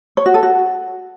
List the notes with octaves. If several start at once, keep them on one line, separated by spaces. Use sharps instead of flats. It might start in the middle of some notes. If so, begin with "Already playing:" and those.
C#5
F#4
A4
F#4